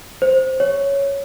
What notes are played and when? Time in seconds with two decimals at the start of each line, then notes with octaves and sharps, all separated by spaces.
0.22 C5
0.60 C#5